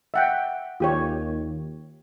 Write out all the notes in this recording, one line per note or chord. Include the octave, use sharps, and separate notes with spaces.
E5 F#5 G5
D#2 F4 G4 C#5